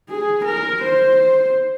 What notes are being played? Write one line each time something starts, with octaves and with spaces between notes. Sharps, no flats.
G#4
A#4
C5